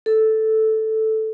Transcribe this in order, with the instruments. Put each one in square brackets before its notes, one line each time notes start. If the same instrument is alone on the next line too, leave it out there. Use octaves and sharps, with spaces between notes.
[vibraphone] A4